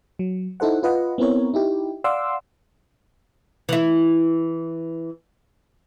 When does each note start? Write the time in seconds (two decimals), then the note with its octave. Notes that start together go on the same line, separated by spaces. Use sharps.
0.19 F#3
0.60 D#4 E4 A4 C5 F#5
0.83 F4 B4 D#5 F#5
1.18 B3 C4 E4 A#4 C#5
1.54 D#4 E4 G4
2.04 D5 F5 F#5 C6 D6 E6
3.69 E3 E4